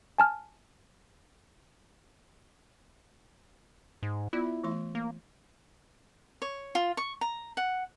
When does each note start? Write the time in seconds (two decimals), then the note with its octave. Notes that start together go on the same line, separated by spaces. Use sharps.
0.18 G#5 A5 F6
4.03 G#2
4.33 B3 E4 F4 D5
4.64 E3 A3 C6
4.95 A#3
6.42 C#5
6.75 F4
6.97 C#6
7.21 A#5
7.57 F#5